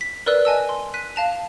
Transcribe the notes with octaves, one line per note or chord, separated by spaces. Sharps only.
B6
A#4 B4 D5 E6 F#6
D#5 G#5 A5 E6
C6
F#6 B6 D#7
F5 A5 F7